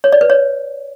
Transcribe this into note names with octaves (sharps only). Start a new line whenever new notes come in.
C#5
D5
B4
C#5